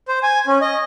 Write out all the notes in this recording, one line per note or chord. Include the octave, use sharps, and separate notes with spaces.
C5
G#5
C#4
D#5